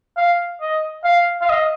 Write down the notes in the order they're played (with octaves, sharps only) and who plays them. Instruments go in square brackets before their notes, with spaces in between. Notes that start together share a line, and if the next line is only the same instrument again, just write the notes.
[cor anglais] F5
D#5
F5
F5
D#5